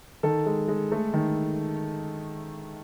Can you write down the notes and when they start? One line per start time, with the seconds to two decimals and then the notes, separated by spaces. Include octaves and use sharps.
0.23 D#3 A4
0.46 G#3
0.68 G#3
0.92 A3
1.14 D#3